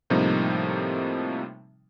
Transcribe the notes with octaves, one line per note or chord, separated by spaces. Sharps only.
A2 C3 F3 G3 A#3 D#4